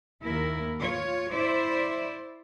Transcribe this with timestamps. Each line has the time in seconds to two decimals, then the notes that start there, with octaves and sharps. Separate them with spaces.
0.24 D#2 E4 A#4
0.79 F4 C#5
1.32 E4 C5 D5 E5